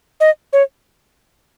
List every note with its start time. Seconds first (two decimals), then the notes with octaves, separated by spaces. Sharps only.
0.20 D#5
0.53 C#5